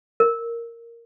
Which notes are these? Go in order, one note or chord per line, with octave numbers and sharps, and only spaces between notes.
A#4